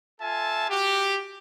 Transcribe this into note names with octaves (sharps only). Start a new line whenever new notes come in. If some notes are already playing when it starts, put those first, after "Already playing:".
F4 A4 E5 G#5 A5
F#4 G4